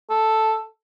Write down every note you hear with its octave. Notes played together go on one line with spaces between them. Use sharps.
A4